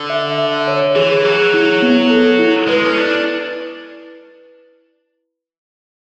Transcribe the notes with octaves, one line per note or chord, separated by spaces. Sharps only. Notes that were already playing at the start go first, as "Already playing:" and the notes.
Already playing: D3
E5
E5
C#5
E3 G#4
F#3 G#4
E4
B3
A4
E4
G#3 B4
C#4
D4 E4